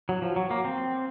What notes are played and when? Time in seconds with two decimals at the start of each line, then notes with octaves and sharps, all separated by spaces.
0.09 F#3
0.22 F3
0.36 F#3
0.51 A#3
0.65 C4